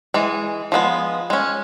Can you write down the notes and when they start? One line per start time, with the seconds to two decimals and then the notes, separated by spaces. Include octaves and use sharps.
0.14 E3 G#3
0.72 F3 G#3 B3
1.30 G#3 C#4